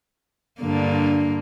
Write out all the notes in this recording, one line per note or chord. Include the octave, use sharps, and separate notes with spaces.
G2 D3 A#3